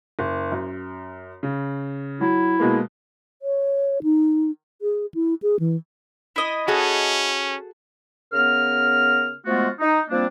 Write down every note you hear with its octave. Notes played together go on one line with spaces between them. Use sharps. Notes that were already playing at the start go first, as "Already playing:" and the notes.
F#1
F#2
C#3
F#3 E4
B2 G#3 A#3
C#5
D#4
G#4
E4
G#4
E3
E4 D#5
C#4 F#4 G#4 A4
C#3 B3 A#4 F6
F3 G#3 A3 B3 F4 F#4
D#4
F3 G3 A#3 C4 D4